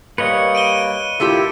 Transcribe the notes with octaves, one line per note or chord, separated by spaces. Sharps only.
G3 A#3 B4 C#5 D#5 C#7
D7 D#7 G7
D#3 A3 E4 F4 G4